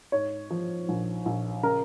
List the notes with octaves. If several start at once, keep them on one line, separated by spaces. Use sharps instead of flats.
G#2 C#5
F3
A#1
A#1
C#3 A#4